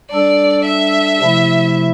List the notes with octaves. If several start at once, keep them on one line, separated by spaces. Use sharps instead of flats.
G3 D4 A4 D5
E5
C3 F3 A3 E4